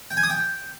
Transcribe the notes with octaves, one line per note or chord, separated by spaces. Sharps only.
G5
G#5
D#6
G5